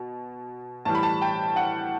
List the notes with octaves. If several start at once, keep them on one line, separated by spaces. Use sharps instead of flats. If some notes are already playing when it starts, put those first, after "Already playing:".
Already playing: B2
A2 E3 G3 A5
B5
A5
G5
F#5